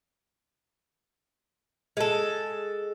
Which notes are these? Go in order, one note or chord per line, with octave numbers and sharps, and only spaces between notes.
G#3 A4